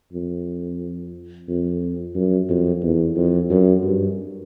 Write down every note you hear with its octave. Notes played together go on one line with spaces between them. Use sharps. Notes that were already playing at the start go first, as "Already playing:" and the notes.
F2
F2
F#2
F2
E2
F2
F#2
G2